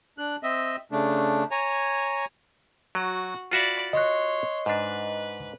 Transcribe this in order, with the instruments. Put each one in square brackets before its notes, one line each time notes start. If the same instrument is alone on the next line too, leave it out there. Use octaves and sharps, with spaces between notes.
[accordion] D4 F#6
C4 D#5 E5
C#3 A3 D4
C#5 G#5 A#5
[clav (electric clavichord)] F#3 [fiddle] F#4
[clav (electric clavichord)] F4 F#4 E5 [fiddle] D5 B5
[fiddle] C#5 C6 [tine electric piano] D#5 F#6
[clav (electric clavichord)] G#2 D4 [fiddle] B4